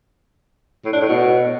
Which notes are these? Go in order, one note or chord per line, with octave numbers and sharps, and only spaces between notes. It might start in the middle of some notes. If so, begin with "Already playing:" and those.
A2
D4
A2
B2